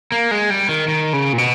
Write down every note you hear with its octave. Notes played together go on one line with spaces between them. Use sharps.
A#3
G#3
G3
D#3
D#3
C#3
A#2
B2